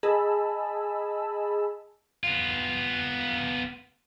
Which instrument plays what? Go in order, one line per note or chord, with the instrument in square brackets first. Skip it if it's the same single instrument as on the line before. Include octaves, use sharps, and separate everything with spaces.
[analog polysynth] G#4 D#5 G#5 A5 B5 E6
[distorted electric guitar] B3 F4